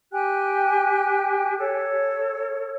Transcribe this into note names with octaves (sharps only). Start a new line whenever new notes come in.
G4 G5 G#5 F#6
A4 C#5